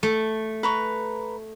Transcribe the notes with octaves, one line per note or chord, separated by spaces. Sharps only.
A3
B4 A#5 C#6